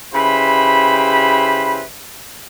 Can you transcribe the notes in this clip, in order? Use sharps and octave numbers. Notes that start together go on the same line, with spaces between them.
C#3 E4 G4 B4 C5 B5